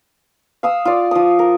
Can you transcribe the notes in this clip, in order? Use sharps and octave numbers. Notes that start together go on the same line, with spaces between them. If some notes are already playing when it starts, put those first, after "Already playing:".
F5 D#6 E6
F4 D5
F3 D#6
A#4